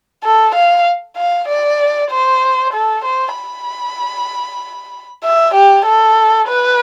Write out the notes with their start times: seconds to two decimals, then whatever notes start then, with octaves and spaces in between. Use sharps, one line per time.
0.24 A4
0.55 F5
1.17 F5
1.48 D5
2.11 C5
2.74 A4
3.05 C5
3.36 B5
5.24 E5
5.54 G4
5.86 A4
6.48 B4